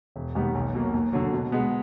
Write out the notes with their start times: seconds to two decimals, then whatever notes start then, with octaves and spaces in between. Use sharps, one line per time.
0.16 E1
0.35 D#2 D#3 G3 B3
0.55 B1
0.74 B2 F#3 A#3
0.94 D#2
1.13 D3 F#3
1.33 B2
1.52 G#3 B3